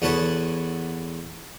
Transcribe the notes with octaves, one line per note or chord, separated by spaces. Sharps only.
E2 B3 F#4 A4 B4 C#5